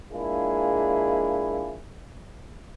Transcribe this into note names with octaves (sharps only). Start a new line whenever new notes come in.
G#3 A#3 D4 E4 F4 G#4